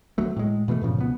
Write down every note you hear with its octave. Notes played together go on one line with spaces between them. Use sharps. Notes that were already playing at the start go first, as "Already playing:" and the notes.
D2 F#3 A3
A2 G#3
B2 E3 G#3 A3
G2 A#2 C#3 F3
C#2 B2 B3